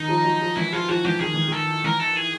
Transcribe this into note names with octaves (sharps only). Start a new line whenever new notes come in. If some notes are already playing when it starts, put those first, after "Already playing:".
Already playing: D#3 D#4
F3
F#3
F3
E3 E4
F3 F4
F3 F#4
E3 G4
D#3 G#4
E3
D#3 A4
E3 A#4
A4
G#4